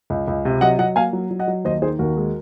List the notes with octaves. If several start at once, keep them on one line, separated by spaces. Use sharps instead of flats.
C#2
C#2
C3
F#3 D#5 F#5
F#3 D#5 F#5
A#3 F5 G#5
F#3
F#3
D#5 F#5
F#3
D#2 C5 D#5
D#3 G#4 C5
D#2 F#4 A#4
G#3